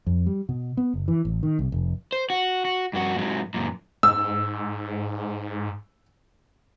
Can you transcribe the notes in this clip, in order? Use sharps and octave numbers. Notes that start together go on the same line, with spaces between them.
F2
G3
B2
B3
F#1
E3
A1
D#3
C2
F1
C5
F#4
F#4
G2 F#4
G#2 F#3
F#2 A#2
G#2 E6